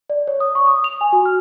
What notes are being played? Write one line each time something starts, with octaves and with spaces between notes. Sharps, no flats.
D5
C#5
D#6
C#6
D#6
F7
G#5
F#4
F6